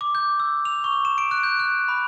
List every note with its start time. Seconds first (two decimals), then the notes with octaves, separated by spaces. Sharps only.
0.01 D6
0.15 G6
0.40 E6
0.65 F7
0.84 C#6
1.05 E7
1.18 D7
1.31 F#6
1.43 G6
1.60 F#6
1.88 B5